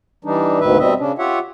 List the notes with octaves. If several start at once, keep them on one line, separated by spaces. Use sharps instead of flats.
E3 G3 D4 D#4
D2 G#2 B2 D#3 B4 E5
B2 G3 C4 D#5 E5
C#3 C#4 D4
F4 G4 C#5 E5 F#5